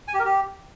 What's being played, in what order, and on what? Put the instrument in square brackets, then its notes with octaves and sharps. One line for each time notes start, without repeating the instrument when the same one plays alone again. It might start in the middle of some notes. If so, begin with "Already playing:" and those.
[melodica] G#5
G4
A#4
G4